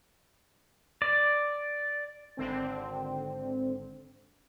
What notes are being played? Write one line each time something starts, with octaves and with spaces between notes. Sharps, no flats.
D5
G#1 D3 C4